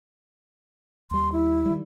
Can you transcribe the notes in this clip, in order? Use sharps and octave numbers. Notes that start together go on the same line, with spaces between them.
D#2 G3 C6
E4
D#3 G3